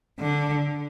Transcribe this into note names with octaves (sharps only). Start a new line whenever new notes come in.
D3